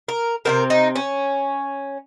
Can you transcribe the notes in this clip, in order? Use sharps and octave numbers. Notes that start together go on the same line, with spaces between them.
A#4
C3 G3 C4 A#4
D#4
C#4